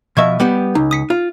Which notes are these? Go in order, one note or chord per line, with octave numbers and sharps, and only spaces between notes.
B2 F3 D#5 E5 C#6 G#6
G3 B3 G4
C#2 D#4
D#6 B6 C#7
F4